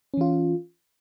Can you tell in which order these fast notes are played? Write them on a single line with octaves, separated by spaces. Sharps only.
C#4 E3 F4